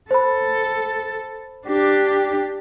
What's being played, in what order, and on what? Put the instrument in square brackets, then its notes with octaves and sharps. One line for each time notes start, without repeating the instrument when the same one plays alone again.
[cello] A4 [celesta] C5 B5
[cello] D4 G4